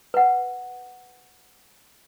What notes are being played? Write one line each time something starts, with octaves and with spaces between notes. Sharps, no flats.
B4 F#5